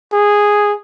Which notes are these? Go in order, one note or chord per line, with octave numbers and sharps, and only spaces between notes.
G#4